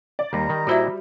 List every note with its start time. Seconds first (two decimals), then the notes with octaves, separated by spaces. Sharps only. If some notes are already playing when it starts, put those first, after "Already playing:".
0.19 D5
0.33 D#2 G3 A#5
0.49 D#3
0.67 A#2 D#4 E4 F#4 C5 E5